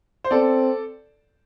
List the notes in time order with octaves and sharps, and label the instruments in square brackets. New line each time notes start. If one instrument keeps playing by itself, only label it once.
[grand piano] C5
[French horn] C4 [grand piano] A4 D5